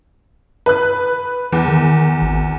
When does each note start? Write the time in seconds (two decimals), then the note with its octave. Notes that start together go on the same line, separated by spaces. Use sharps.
0.66 B4 F#6
1.52 E2 E3
1.68 D#3
2.22 G#1